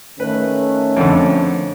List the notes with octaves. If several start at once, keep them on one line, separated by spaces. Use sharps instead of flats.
D#3 A3 C#4 B4
F2 D3